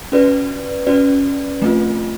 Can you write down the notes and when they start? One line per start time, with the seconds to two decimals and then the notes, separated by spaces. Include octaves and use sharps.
0.12 C#4 F#4 B4 D5
0.87 C#4 F#4 B4 D5
1.62 F3 A3 C4 F4